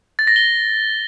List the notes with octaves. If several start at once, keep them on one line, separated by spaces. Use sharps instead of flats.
A6
A#6
G7